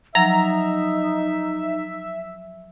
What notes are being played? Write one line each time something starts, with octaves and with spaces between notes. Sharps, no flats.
F3 F#3 D#4 E5 A#5